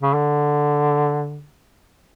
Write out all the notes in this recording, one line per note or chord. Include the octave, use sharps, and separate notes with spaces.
C#3
D3